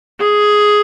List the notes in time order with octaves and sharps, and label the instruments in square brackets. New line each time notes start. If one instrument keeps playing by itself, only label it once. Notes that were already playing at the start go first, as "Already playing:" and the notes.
[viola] G#4